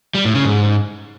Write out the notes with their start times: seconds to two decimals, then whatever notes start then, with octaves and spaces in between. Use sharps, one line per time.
0.15 G3
0.25 A2
0.35 C#3
0.45 G#2